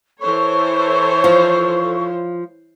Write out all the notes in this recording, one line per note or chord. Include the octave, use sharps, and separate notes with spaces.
E3 A4 C5 C#5 C#6
F3